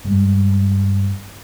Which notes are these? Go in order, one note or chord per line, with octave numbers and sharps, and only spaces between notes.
G2 G3 G#3